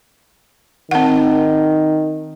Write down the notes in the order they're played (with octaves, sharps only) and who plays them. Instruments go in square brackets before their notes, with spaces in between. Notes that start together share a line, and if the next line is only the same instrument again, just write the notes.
[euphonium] D#3 [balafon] C4 F#5